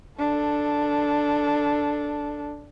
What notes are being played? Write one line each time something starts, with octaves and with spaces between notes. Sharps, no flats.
D4 A4